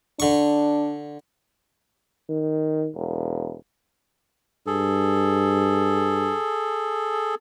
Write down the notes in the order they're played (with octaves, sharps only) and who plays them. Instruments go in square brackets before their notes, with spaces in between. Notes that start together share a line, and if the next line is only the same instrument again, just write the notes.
[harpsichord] D3 C#6 [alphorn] D4
[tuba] D#3
E1
[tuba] G2 [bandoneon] G#4 A4